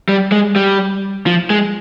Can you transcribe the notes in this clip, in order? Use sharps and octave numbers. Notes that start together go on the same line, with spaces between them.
G3
G#3
G3
F3
G#3